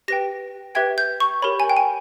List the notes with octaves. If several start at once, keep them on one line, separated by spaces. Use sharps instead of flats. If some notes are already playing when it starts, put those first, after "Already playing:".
G4 B4 G5 A#6
G4 B4 E5 G5 G#6
G6
C#6
G4 A#4 C#5 B5
G#5
G5
G#5